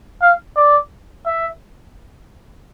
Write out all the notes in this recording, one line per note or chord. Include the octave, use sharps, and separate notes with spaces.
F5
D5
E5